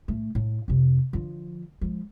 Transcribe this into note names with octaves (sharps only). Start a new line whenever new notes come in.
A2 A3
A2
F2 C3
D3 F3
F3 G#3